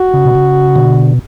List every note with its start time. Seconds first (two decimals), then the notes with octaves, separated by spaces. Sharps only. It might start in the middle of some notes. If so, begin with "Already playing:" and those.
Already playing: F#4
0.14 C#3
0.25 B2
0.35 C#3
0.76 B2 D3